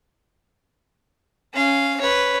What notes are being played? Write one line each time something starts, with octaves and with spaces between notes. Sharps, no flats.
C#4 F5
B4 C#5